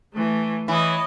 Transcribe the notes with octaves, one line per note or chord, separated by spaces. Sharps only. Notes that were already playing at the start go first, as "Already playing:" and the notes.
E3 A3
E3 C#5 D#5